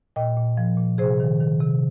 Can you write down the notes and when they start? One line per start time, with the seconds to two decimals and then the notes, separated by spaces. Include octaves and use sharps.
0.16 A#2 D#5 G5
0.37 A#2
0.57 F3
0.77 A#2
0.98 C3 G#4 C5
1.20 D#3
1.40 D#3
1.60 C3